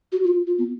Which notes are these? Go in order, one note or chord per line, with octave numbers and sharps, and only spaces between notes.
F#4
F4
F4
B3